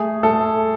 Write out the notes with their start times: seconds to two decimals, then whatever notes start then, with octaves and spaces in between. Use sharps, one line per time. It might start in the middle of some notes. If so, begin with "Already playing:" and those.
Already playing: A3 G#4
0.23 A3 A4